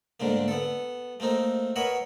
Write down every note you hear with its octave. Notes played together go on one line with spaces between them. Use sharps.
G#2 D3 A3 A#3
B3 A4
A3 A#3 C4 D#4
A#4 B4 C#5 D#5 E5 F#5